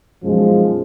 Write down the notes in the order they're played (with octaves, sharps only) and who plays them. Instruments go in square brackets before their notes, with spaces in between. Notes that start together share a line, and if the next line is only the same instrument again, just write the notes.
[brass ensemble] B1 F#2 F3 G#3